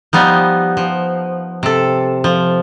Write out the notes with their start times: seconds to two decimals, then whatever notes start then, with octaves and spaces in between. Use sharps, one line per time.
0.13 F3 G3 B3 D#4
0.77 F3
1.63 C3 A4
2.24 F3